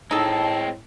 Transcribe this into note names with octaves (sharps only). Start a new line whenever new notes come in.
A2 G#3 C4 D#4 A4 A5